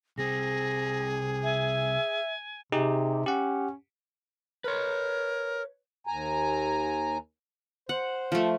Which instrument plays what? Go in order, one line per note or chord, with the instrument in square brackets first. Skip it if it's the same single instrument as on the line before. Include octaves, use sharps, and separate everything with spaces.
[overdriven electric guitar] C2 C4 [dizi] G#4 [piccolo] A#6
[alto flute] E5 [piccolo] G#5
[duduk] C3 [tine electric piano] D#4 G4 G#4
[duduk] C#4 [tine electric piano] G4 F#5
[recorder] A#4 [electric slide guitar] B4 C#5
[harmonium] D#2 G#5 A#5
[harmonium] C5 [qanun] F#5
[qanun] F3 A3